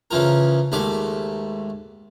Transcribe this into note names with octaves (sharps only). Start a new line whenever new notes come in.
C#3 E3 F3 A#4
D#2 G#2 A3 D6